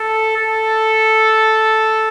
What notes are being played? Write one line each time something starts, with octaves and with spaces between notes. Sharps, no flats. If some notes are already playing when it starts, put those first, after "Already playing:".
Already playing: A4
A4